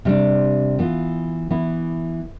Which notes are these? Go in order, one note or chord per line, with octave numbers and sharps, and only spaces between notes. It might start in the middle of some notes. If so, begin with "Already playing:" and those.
C3 G3 D4
E3 B3 F4
E3 B3 E4